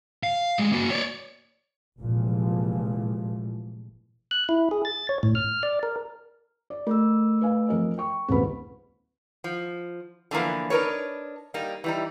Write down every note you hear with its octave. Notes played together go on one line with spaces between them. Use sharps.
F5
G3 G#3
A#3 F#4
C#5 D5
F1 A#2 E3 F3 G#3
F#6
E4
G#4
A6
C#5
A2
F6
D5
A#4
D5
A3 A#4 E6
B4 F5 G#5
F2 A#4 D#5
G5 C#6
D#1 C#2 C4 B4 B5
F3
D3 E3 F3 A#3 B3
D4 D#4 A#4 B4 C#5
G3 A#3 D#4
E3 G3 D#4